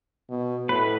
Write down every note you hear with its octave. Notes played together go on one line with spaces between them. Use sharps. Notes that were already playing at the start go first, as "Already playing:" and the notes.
B2
A2 B4